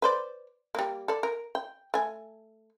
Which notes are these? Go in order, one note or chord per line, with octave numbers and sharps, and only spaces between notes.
B4 C5 D5
G3 A#3
A4 D5
A#4
G5
A3 G#5